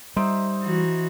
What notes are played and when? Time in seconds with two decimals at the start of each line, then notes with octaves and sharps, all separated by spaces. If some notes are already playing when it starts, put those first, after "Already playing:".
0.17 G3 D#4 C5 E5
0.64 E3 F#4